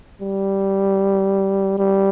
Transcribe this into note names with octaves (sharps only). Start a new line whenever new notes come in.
G3
G3